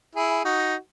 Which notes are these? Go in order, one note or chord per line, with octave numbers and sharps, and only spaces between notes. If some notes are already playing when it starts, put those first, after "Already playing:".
E4 G#4
D#4 F#4